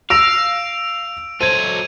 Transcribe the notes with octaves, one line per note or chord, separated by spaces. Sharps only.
F5 E6 A#6 D7 F7
F#3 A4 C5 G#6 D#7